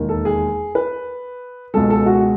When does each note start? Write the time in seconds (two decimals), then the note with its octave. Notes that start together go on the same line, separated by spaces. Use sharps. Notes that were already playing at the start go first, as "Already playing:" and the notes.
Already playing: E1 D#2 D#3
0.09 A4
0.25 G#4
0.75 B4
1.74 C#2 B2 G#3 A4
1.90 A4
2.06 F#4